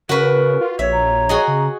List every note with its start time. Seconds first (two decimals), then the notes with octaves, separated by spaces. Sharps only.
0.09 C#3 F#4 A#4 B4
0.61 F4
0.79 A#1 C#5 E5
0.93 A#5
1.29 F#4 G#4 D#5
1.48 C#3